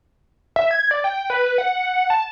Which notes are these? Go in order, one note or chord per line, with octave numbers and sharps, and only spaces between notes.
E5
G#6
D5
G5
B4
B4
F#5
A5